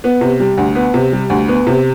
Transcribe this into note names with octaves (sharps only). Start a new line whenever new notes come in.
B3
C3
G3
D2
B3
C3
G3
D2
B3
C3